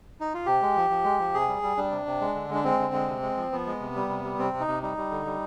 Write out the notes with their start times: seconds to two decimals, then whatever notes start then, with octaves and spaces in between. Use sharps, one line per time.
0.20 D#4
0.34 F4
0.46 C3 G4
0.62 G#3
0.76 F3
0.90 F3
1.04 G#3
1.19 F3
1.34 C3 G#4
1.49 G3
1.63 G3
1.77 G3 D4
1.91 C3
2.06 C3
2.21 G#3
2.35 D3
2.50 G#3 D4
2.64 G#3 C4
2.79 D3
2.94 G#3
3.08 C3
3.22 G#3
3.37 F3
3.52 F3 B3
3.67 G#3
3.80 C3
3.96 G3
4.09 C3
4.24 G3
4.38 C3 C4
4.53 C3
4.60 D#4
4.68 C3
4.82 G3 D#4
4.97 G3
5.11 D3
5.26 G3